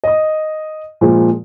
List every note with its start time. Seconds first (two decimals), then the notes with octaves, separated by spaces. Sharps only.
0.04 D#5 D#6
1.01 A#2 F3 G#3